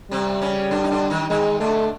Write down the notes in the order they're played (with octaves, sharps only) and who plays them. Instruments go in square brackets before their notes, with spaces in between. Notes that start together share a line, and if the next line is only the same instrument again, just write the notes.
[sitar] C3 C4 [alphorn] G3
[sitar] C#3 C#4
D3 D4
D#4
D3 D4
D#3 D#4
[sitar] D#3 D#4 [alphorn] G#3
[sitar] D3 D4 [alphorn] A3